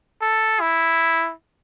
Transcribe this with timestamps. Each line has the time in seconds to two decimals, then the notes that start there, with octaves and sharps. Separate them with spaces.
0.22 A4
0.61 E4